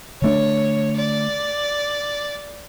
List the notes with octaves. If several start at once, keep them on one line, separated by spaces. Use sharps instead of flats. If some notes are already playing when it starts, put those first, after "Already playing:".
D3 A3 D4 C#5
D5